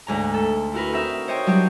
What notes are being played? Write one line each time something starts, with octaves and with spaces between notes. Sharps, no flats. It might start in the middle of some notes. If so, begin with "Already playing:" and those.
D2 G#2 A#5
A4
E4 F#4 A#4 B4
C4 D#4 A#4 E5
C5 C#5 D#5 G5
F#3 G3 D4 G4